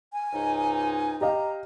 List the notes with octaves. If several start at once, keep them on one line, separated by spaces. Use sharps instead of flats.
G#5
C#2 G#2 D#4
G4 D#5 F5 A#5